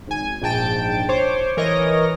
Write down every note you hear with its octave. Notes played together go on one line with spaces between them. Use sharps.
G#1 G#5
A#1 G#2 G5 A5 D7
C5 C#5 D6
E3 A#4 C#5 D#5 A#6